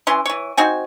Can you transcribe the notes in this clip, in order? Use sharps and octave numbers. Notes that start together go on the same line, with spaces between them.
E3 C#4 C6
E3 C#5
C4 D#4 F#4 G#5